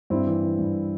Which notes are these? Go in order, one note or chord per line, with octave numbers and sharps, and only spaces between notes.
G2 C4 E4
E3
E3
G2